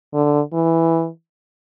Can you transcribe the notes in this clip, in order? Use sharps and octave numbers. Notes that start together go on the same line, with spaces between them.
D3
E3